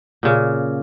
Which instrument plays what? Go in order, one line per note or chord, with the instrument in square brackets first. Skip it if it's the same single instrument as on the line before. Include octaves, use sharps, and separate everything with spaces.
[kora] A#2 C#3